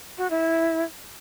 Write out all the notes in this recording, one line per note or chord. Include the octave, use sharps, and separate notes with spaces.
F#4
E4